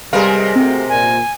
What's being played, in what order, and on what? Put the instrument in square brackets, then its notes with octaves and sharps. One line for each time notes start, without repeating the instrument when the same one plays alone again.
[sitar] C3 G#3 A#4 [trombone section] G3 [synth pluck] G#4 B4 F5
[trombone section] A3 F#4 G4 [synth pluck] C4
[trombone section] A#2 [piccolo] G#5